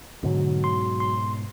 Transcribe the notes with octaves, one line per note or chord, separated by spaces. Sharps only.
G#2 B2 D3 F#3
C6
C6